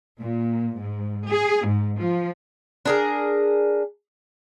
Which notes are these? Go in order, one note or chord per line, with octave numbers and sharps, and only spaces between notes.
A#2
G#2
G#4
G#2
F3
D4 G#4 A#4